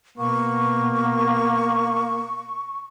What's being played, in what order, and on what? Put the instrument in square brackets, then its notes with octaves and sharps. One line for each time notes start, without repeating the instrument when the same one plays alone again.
[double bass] B2 B3 [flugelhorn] A#3 [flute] C#6